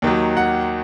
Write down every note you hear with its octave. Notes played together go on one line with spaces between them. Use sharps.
D#2 D#3 F#3
F#5